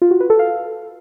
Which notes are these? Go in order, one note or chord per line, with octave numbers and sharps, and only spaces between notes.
F4
F#4
B4
A4
F5